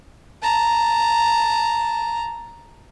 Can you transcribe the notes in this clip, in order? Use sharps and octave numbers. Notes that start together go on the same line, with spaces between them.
A5 A#5